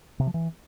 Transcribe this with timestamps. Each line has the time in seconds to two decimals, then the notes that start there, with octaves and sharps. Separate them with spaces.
0.20 C3
0.27 F3
0.34 E3